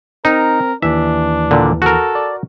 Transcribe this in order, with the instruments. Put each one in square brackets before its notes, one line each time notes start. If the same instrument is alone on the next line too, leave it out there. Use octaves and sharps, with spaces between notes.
[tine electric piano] C4 [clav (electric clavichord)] D#4 [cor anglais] A#4
[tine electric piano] D#2 E3 [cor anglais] D4 [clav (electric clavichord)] E5
[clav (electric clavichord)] A#2 D3
[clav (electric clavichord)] F#4 A#4 [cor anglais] A4
[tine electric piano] D5